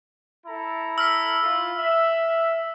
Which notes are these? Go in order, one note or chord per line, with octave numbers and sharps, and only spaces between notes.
E4 A4 A#5
E6 F6 B6
E4 F4
E5